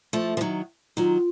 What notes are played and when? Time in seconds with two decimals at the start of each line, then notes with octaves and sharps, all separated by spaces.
0.13 F3 A3
0.37 F3
0.41 D#3 F#3
0.97 D#3 F#3 F4